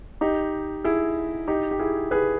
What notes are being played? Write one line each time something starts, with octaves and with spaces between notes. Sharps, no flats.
D#4 G4
E4 G#4
D#4 G4
G4
E4 G#4
G#4 B4